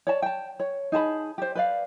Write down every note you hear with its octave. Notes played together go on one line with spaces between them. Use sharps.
C#5 D5 A5
G5 A5
C#5
D#4 G#4 A5 B5
G4 C5
B4 D5 F5